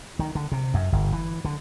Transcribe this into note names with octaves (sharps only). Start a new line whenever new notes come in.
D#3
D3
C3
F#2
G1
E3
D3